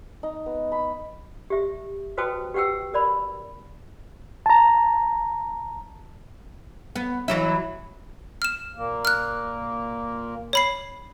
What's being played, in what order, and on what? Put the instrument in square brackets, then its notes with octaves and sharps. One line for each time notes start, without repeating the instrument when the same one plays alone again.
[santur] D#4
B3
B5
[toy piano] G4 E5
F#4 B4 C5 G5 A5 D#6
G4 B4 F#5 G5 E6
A#4 D5 B5
[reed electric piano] A5 A#5
[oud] B3
E3 F#3 E4
[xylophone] F6 E7
[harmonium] A#2 A#3
[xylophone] F6 F#6
C#5 B5 C7